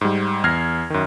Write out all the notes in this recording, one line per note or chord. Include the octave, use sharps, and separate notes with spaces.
G#2 G3
E2 F6 G#6 A#6 C7
F#2 D#3